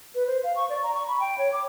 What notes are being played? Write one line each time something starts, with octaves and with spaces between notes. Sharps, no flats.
B4
C5
F5
C#6
D5
A#5
C#6
B5
G5
C#5
D6